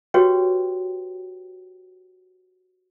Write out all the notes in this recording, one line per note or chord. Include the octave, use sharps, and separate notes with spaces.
F#4 G4 B4 C#5 G5